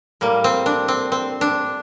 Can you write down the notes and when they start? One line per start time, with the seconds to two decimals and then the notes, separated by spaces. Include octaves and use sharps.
0.21 A2 G3 A#3
0.44 C4
0.66 D4
0.88 C4
1.12 C4
1.41 D4